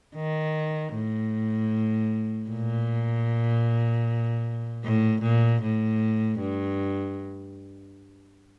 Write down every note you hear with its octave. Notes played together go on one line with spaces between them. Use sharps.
D#3
A2
A#2
A2
A#2
A2
G2